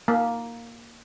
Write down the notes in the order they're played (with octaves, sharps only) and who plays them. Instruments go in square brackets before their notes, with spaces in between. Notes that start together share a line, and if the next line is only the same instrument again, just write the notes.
[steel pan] A#3